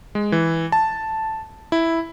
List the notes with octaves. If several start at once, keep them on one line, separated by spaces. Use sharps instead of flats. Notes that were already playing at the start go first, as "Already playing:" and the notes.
G#3
E3
A5
E4